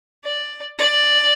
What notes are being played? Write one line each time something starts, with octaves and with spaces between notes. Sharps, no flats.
D5
D5